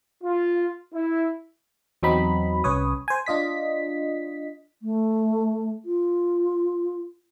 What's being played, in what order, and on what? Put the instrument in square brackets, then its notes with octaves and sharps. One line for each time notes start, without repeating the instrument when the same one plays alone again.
[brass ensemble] F4
E4
[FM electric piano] E2 F#3 C4 D#4 B5
C2 C#4 B4 C#5 D#6
C5 G#5
D4 F4 D#5 B6
[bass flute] A3
F4